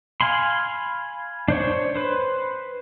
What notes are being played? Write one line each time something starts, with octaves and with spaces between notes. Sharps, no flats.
F5 G#5 B5 C6
D4 C5 C#5
B4 C5